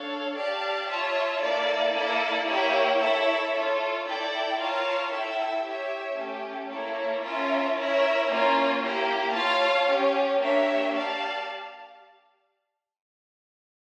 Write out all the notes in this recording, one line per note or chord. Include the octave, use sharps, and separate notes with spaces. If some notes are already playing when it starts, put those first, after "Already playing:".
Already playing: D4 A4 C#5 F5
G4 D5 F5 A5
F4 C#5 E5 A5
A#3 E4 A4 D5
A#3 E4 A4 D5
A#3 E4 G4 C#5 G5
E4 A4 C#5 E5
F4 A4 C#5
E4 A4 D5 G5
F4 A#4 C#5 F5 A5
E4 A4 E5 G5
G4 C#5 E5
A3 C#4 G4
A#3 E4 A4 C#5
C#4 F4 A#4 E5 A5
E4 A#4 C#5 E5
A#3 C#4 F4 C#5
A#3 E4 G4
F4 C#5 F5 A5
C#4 G4 C#5
A#3 D4 G4 C#5 E5
G4 D5 F5 A5